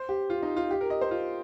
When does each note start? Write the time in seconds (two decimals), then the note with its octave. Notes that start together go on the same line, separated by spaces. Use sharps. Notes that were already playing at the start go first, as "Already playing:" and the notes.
Already playing: C5
0.09 G4
0.30 F4
0.42 D#4
0.56 F4
0.71 G4
0.81 A#4
0.90 D#5
1.01 C5
1.11 F4